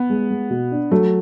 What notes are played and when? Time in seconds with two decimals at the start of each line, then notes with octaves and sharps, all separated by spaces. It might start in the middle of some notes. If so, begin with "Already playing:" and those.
Already playing: B3
0.10 G#3
0.30 G#3
0.50 B2
0.72 D4
0.91 F#3 A3